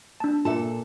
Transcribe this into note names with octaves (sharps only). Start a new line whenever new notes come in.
D4 A5
A#2 F4 A4 E5 A5